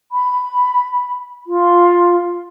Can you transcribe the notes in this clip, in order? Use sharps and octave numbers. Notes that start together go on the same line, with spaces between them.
B5
F4